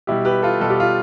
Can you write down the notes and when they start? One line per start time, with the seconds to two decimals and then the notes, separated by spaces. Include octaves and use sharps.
0.07 B2 G3 E4 G4
0.25 G4 B4
0.42 F4 A4
0.60 B2 G3 A4
0.70 G4
0.80 F4